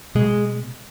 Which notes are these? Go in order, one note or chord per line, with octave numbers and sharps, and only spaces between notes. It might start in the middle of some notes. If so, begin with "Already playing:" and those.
B2 G#3